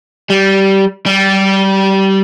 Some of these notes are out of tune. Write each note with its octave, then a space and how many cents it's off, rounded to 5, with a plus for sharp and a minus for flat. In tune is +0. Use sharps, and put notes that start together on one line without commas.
G3 -15
G3 -20